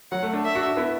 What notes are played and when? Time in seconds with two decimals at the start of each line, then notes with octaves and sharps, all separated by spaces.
0.11 F#3 F#5
0.22 A3
0.33 A3 D4
0.44 E5
0.55 D4 F#4
0.65 D4 F#4
0.77 B3 E4